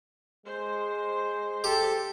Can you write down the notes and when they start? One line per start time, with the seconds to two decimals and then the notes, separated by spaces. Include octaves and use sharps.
0.46 G#3 C5
1.64 G4 A4